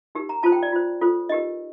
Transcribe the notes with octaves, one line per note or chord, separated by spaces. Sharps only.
D#4 G4 A#4
A#5
F4 A4 C5 A5
G5
D5
F4 C5
F4 A4 C5
D#4 G4 A#4 D#5